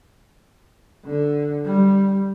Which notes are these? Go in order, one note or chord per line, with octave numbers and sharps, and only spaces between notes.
D3
G3